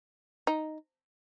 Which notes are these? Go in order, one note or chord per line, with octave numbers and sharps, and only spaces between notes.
D#4